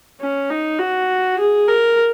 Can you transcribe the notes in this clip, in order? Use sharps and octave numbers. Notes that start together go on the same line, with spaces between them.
C#4
D#4
F#4
G#4
A#4